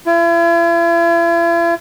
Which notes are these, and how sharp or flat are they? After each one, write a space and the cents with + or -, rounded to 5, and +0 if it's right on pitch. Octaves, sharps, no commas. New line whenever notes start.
E4 +45